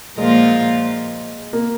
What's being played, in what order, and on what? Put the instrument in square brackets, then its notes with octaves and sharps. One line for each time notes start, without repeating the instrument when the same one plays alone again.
[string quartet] A#2 F3 A#3 F4 A#4 [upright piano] G#3
[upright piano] A#3